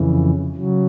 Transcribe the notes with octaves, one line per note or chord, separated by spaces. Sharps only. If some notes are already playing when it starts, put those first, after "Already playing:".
Already playing: F2 C#3 E3
C#3 F#3